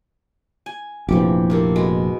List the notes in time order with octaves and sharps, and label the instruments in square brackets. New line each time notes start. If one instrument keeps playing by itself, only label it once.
[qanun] G#5
[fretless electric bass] F1 A#1 F3 [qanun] E3 G4
[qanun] C3 A#3 A4
B2 G#3 B5